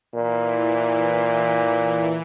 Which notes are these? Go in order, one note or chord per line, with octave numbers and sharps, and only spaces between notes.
A#2 E3